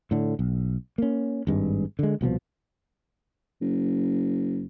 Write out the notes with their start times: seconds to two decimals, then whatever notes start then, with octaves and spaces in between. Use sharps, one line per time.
0.11 A2 D3
0.39 B1
0.98 A#3 C#4
1.47 G#1 G2 G#3
1.99 D3 G#3
2.21 C2 B2 D#3 F3
3.61 F#1